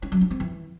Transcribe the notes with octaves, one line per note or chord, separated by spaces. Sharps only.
C#4
F#3
D4
C4
E3